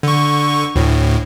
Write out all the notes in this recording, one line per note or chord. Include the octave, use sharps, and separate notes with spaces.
D3 C#6
D2 A2